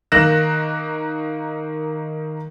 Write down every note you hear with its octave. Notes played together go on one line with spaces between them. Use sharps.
D#3 A#3 F#6 A#6 E7